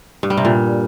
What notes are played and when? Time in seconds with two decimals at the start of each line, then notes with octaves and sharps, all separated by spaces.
0.23 G2
0.30 G3
0.37 C3
0.45 A#2